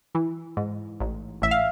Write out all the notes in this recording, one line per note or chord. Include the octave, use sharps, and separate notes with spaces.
E3
G#2
A1
A1 E5
F5